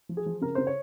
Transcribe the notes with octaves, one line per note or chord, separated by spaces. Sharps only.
F3
G#4
F3
C#3 A#4
C#3 C5
C#5